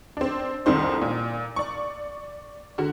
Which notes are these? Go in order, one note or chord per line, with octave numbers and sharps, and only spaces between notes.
C4 D4
C2 F2 D#3 C5
A#2
D5 C#6
D3 F#4